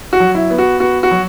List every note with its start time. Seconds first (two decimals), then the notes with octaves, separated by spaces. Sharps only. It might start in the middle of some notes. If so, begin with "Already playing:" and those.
0.13 F#4
0.20 F#3
0.35 E4
0.50 B3
0.58 F#4
0.80 B3 F#4
1.03 F#4
1.11 F#3